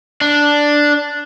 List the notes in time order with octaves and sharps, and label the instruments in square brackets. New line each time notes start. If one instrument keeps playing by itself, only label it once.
[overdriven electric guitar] D4